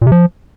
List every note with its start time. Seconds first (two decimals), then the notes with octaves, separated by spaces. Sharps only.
0.02 A#2
0.07 C3
0.12 F3